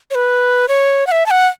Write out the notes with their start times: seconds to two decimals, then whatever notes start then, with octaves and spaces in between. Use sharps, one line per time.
0.11 C#5
0.15 B4
0.68 C#5
1.07 F#5
1.11 E5
1.26 A5
1.31 F#5